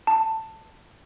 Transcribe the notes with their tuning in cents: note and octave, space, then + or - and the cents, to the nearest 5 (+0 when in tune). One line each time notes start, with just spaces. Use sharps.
A5 +15